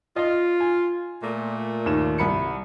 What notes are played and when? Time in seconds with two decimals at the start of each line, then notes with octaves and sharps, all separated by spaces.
0.16 F4 D#5
0.60 G#5
1.23 A#2 A3
1.86 D#2 E7
2.18 C2 B5 C#7